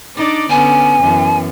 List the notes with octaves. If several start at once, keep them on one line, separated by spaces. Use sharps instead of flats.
D4 D#4 D5
D3 B3 C#4 G#5
F#2 E3 B3